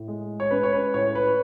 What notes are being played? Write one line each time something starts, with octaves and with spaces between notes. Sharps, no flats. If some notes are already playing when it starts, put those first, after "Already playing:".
Already playing: A2
G#3
C#5
C#4 B4
C#5
B4
A2 C#5
B4